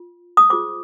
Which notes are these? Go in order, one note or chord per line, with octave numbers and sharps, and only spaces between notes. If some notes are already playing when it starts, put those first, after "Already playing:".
Already playing: F4
D#6
F4 G#4 C5 D6